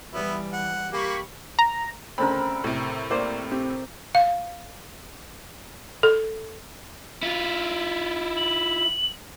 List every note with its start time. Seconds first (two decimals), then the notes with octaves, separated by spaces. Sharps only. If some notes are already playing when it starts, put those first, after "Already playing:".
0.13 E3 G3 B3 E4
0.53 F#5
0.92 A#3 G4 B5 C#6
1.59 A#5
2.18 D2 C#3 C4 A4 A#4 B5
2.64 A2 C3
3.10 A#3 C5 D5
3.51 C4 G4
4.15 F5
6.03 A4
7.23 E4 F4
8.36 F#7